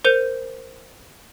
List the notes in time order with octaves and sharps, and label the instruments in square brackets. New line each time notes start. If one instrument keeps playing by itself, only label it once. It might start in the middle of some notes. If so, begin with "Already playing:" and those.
[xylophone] A#4 C5 G6 C#7 D#7 F7